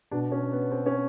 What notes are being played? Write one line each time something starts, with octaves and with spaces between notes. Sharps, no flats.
B2 D4
C#4
B3
C4
C#4